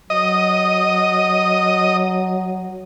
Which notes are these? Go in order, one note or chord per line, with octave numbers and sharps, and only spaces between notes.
F#3 D#5